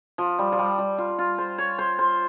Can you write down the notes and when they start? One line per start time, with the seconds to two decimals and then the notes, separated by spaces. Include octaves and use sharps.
0.18 F3
0.39 G3
0.52 F3
0.59 G3
0.78 G3
0.98 F4
1.18 F4
1.38 C5
1.58 C#5
1.78 C5
1.99 C5